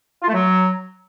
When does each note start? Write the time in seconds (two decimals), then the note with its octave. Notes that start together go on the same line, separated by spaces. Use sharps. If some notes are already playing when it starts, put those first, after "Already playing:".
0.22 F4
0.28 A3
0.33 F#3